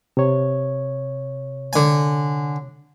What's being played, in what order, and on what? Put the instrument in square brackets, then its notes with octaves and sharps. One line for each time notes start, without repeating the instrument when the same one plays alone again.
[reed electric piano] C3 C#5
[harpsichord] D3 G#5